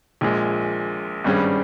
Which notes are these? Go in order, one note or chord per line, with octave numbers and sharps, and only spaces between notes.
A#1 A#2 G#3
G#1 G2 G3 C#4 G#4